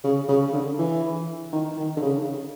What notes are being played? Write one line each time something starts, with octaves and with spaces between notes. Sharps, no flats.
C#3
C#3
D3
E3
D#3
D#3
D3
C#3